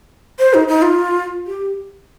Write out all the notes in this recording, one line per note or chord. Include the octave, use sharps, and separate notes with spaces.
C5
D#4
D#4
F4
G4